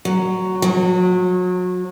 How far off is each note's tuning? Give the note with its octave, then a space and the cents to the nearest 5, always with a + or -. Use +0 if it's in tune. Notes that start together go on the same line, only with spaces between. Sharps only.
F#3 +5
F#3 -30